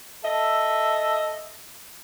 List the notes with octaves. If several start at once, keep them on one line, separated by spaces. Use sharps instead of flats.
A4 D#5 E5